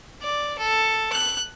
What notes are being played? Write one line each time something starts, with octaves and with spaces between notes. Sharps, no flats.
D5
A4
F#6